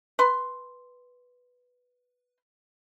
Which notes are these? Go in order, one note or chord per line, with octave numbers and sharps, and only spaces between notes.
B4 C6